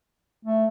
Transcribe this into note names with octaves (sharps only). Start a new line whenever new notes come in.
A3